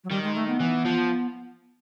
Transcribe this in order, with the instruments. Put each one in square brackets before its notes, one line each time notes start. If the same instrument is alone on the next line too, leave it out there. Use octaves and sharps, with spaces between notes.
[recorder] F#3
[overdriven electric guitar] D#3 [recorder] G3
[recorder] G#3
A3
B3
[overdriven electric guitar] E3
F3